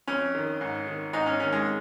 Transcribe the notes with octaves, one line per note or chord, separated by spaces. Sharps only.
F2 C#4
D#3
G#2
D#3
G#2 D#4
C#4
D#3 C#4
G#3